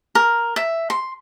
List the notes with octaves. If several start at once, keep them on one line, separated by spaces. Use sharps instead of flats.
A#4
E5
C6